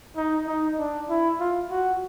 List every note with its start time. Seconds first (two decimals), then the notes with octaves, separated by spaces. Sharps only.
0.16 D#4
0.47 D#4
0.78 D4
1.09 E4
1.40 F4
1.70 F#4